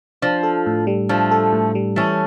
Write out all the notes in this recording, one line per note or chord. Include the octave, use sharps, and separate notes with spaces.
F3 D4
A4
A2
G3
F3 A3 D4
A4
A2
G3
E3 A3 C#4